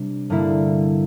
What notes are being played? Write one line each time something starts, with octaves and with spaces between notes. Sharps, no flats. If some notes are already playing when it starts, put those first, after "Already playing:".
Already playing: C3 G3 D4
G2 D3 G3 A#3 E4